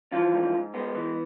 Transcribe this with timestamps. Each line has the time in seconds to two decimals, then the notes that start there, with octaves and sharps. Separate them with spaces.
0.12 E3 F3 F4
0.33 G#2
0.54 G#2
0.74 G#3 B3
0.95 E3